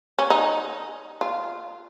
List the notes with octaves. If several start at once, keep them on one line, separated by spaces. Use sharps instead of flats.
C#4
D#4
F4